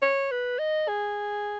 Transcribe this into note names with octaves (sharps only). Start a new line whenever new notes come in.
C#5
B4
D#5
G#4